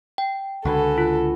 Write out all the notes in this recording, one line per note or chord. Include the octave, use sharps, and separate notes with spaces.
G5
C#2 D3 F#4 A4 B4 G#5
F4